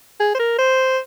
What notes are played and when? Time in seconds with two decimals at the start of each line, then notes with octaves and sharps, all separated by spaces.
0.20 G#4
0.34 C5
0.39 A#4
0.58 C5